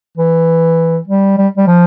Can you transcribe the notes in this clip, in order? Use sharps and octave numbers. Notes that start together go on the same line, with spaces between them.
E3
G3
G3
G3
F3